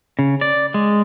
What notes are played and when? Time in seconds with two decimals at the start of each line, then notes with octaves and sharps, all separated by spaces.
0.19 C#3
0.41 D5
0.74 G#3